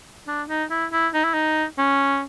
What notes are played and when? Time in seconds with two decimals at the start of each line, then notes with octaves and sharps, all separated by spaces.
0.27 D4
0.49 D#4
0.70 E4
0.92 E4
1.14 D#4
1.24 E4
1.34 D#4
1.78 C#4